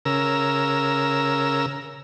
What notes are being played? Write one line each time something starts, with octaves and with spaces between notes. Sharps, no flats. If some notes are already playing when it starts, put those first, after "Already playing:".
C#3 A#4 E6